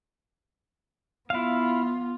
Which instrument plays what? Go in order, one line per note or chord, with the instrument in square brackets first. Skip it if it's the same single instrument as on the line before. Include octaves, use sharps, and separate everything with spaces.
[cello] B3 F4 [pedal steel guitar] E4 F5